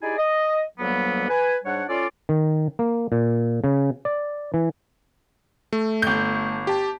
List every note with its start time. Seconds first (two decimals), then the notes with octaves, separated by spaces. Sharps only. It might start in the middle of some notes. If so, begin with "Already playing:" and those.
0.01 D#4 E4 G4 G#4 D5 G#5
0.17 D#5
0.78 D2 F#3 G3 A#3 B3
1.29 B4 G#5
1.64 G#2 G3 D4 C#5 F#5
1.88 C#4 F4 A4 D5
2.29 D#3
2.79 A#3
3.12 A#2
3.64 C#3
4.05 D5
4.54 E3
5.73 A3
6.02 G1 G6
6.67 G4 A5